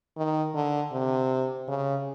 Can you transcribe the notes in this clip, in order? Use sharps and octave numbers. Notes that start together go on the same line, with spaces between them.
D#3
D3
C3
C#3